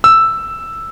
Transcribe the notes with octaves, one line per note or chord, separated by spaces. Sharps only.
E6